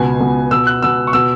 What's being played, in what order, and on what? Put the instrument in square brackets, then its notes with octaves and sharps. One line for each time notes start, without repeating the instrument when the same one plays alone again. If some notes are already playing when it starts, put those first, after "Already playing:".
Already playing: [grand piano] C#2 B2 B3 G#5
C#2 B2 B3
B2 B3 E6
F#6
B2 B3 E6
C#6
B2 B3 E6